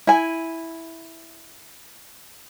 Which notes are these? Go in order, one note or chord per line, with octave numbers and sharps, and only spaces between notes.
E4 G#5